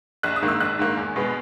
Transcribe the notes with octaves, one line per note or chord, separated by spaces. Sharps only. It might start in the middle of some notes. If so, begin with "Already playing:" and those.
A#1 F#6
D#6
G#2 D#3 A#3
E6
A#1 F#6
G#2 D#3 A#3
E2
B2 G#3 B3